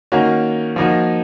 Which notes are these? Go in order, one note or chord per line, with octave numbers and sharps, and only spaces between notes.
D#3 A#3 C#4 F#4
F3 A#3 D#4 F#4